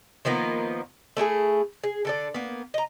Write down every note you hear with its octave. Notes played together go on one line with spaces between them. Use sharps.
D#3 F3 A#3 B3
A3 E4 F4 G#4
G#4
D3 A4 D5
A#3 B3
D#5 A#5